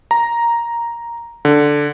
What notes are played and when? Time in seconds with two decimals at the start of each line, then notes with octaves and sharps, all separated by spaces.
0.11 A#5
1.45 D3